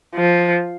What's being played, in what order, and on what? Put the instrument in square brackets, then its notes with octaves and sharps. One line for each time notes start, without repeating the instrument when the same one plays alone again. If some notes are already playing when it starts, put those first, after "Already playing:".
[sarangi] F3